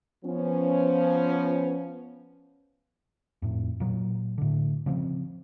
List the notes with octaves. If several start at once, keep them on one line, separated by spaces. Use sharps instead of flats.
F3 B3 C#4
F2 A2
A#2 F#3
A2 D3
C#3 F3 G#3 C4